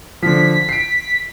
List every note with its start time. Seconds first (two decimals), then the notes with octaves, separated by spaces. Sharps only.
0.22 D3 F3 B6
0.69 C7 D7